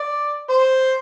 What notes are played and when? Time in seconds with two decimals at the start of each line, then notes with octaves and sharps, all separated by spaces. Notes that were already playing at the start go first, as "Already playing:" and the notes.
Already playing: D5
0.50 C5